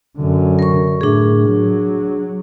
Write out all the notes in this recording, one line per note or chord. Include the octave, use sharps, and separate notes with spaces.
F#2 D3
A#4 C#6
A2 D4 G#4
F#3